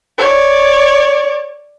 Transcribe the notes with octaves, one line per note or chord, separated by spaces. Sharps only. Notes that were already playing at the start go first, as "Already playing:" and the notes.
C#5 D5